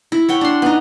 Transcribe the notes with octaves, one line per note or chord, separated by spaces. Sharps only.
E4
C#5 F#5 G5
D4 C6
B3 D#4